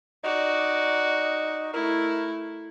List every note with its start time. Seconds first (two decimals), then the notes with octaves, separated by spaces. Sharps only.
0.24 D#4 F#4 D5
1.73 A3 E4 A#4